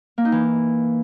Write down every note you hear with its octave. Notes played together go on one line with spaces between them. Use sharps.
A#3
D#4
E3